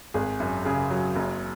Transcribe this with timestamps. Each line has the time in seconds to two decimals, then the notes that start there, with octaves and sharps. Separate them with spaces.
0.14 G#1 G#4
0.40 F#2
0.65 C#3 G#4
0.90 F#3
1.16 F#1